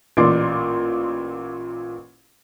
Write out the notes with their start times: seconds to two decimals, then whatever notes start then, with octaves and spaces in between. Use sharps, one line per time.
0.17 A1 A#2 D5 C6 D6